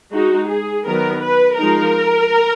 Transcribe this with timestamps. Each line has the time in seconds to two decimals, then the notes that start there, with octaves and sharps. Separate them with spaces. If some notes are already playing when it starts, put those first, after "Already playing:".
0.12 G#3 D#4 F#4
0.48 G#4
0.86 D#3 F#3 B3 A#4
1.22 B4
1.58 F3 G#3 D#4 A#4